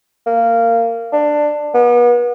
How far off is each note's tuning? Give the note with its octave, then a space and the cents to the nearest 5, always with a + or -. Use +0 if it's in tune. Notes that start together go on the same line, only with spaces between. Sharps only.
A#3 -15
D4 +10
B3 -35